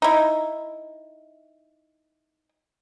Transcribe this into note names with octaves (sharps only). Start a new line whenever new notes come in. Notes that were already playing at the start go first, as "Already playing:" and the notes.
D#4 E4